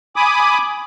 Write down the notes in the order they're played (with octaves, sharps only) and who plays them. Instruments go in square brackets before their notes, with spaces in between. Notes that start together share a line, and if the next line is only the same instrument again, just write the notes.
[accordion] G#5 B5 D6 D#6